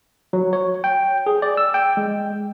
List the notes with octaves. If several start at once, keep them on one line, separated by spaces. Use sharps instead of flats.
F#3
C#5
G5
G#4
D5
E6
G5
G#3